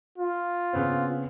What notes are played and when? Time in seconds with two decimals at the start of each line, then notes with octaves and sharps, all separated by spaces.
0.18 F4
0.73 C#3 B3 C4